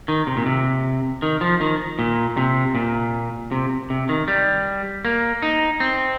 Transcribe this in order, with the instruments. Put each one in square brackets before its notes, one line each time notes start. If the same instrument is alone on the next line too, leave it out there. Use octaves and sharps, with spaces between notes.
[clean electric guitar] D#3
C3
A#2
C3
D#3
F3
D#3
A#2
C3
A#2
C3
C3
D#3
G3
A#3
D#4
C4